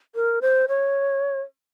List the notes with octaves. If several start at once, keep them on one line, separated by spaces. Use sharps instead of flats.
A#4
C5
C#5